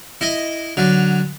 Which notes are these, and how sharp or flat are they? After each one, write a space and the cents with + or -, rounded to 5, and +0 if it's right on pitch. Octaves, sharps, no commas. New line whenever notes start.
E4 +0 D#5 +0
D3 +0 F#3 +0